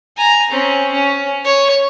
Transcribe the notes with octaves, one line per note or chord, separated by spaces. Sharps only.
G#5 A#5
C4 C#4
C#4
C#5